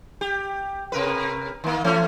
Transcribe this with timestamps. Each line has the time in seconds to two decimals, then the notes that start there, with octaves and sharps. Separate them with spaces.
0.21 G4
0.92 C3 A#4 B4
1.64 D#3 A#3
1.84 E3 A3 C#4